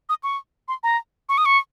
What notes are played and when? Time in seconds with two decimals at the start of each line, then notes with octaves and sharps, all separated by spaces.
0.09 D#6
0.23 C#6
0.68 C6
0.83 A#5
1.29 C#6
1.38 D#6
1.45 C#6